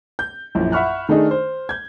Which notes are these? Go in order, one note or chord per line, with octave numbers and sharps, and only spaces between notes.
G6
A#1 F#2 E4
E5 F#5 B5 C#6 F6 F#6
D#3 A3 D4 D#4 G#4 A4
C5
G6 G#6